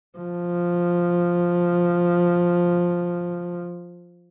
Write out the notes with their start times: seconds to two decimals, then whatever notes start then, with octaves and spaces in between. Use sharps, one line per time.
0.18 F3